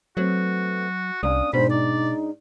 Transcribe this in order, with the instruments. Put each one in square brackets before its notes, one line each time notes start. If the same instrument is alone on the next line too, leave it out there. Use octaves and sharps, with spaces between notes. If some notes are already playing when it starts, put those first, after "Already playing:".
[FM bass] F#3 [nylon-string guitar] A3 B3 C4 [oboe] F#4
[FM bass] C2 [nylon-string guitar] A#3 C#4 D4 [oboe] D#6
[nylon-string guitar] G#2 D4 [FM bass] B2 [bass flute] C5 [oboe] B5
[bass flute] D#4 [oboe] D5